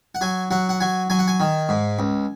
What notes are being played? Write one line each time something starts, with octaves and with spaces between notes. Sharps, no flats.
F#5
F#3 G#5
F#3 F#5
F#5
F#3 G#5
F#3 G#5
F#5
G#5
D#3
G#2
C#2